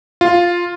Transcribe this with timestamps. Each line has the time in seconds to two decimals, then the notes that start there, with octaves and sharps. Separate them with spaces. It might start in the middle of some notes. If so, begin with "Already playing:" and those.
0.21 F4